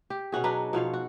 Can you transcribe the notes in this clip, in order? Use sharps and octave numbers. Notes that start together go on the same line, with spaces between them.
G4
B2 C#4 F#4 G#4
F#3 D4 D#4 B4
B2 F3 C#5 F5
F#4